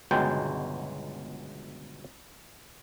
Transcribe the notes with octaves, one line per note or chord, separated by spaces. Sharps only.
G1 C#2 B2 F#3 G#3 G5